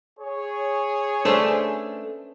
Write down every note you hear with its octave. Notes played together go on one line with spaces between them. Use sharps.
G#4 C#5
A3 C#4 D4 B4 C5